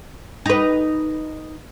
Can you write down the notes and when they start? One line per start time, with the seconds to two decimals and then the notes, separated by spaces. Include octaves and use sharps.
0.46 D#4 B4